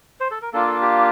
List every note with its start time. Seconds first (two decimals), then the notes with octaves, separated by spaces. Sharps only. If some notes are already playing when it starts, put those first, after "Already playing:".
0.20 C5
0.31 A4
0.42 A#4
0.53 A#3 D4 F4 A4
0.67 A4
0.81 G4